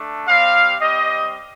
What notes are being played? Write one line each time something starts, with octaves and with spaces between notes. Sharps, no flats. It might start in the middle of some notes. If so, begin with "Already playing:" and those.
Already playing: A3 D4
G3 C4 G4 F5
G3 C4 G4 D#5